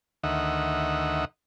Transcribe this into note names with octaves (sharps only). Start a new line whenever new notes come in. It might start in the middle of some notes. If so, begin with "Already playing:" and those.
D2 D#3 D#5 E5 F#5